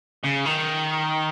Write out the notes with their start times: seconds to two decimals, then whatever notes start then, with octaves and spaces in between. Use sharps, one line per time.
0.24 C#3
0.45 D#3